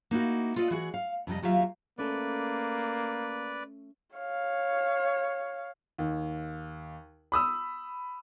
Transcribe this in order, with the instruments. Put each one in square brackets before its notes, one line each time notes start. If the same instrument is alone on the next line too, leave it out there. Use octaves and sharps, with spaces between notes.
[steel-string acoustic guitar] A#3 D#4 E4 F#4
F4 A4 D5 D#5
E3 F#4 G#4
F5
F2 C3 G3 D#5
D#2 F#3 F4 G4 E5 F5
[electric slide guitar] A3 C#4 A4 [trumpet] A#3 [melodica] B4 D5
[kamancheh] C#5 F5
[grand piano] D#2
B5 D#6 E6